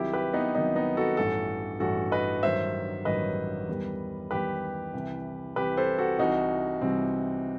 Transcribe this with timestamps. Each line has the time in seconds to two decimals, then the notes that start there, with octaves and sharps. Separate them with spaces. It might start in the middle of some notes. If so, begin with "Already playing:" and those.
Already playing: C2 C3 D#3 F#3 E4 G4
0.13 G4 B4
0.33 B3 D#4
0.55 C2 C3 D#3 F#3 B3 D#4
0.76 B3 D#4
0.97 F#4 A4
1.17 A1 G2 E3 F#4 A4
1.80 A1 G2 E3 F#4 A4
2.12 B4 D#5
2.43 A1 G2 D#3 F#3 C5 E5
3.05 A1 G2 D#3 F#3 B4 D#5
3.68 E2 D#3 G3
4.31 E2 D#3 G3 G4 B4
4.94 C2 C3 E3
5.56 C2 C3 E3 G4 B4
5.77 A4 C5
5.98 F#4 A4
6.19 C2 C3 E3 G3 D#4 F#4
6.82 C2 C3 E3 G3 C4